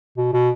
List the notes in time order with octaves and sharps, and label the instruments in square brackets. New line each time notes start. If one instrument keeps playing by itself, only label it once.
[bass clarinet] B2
B2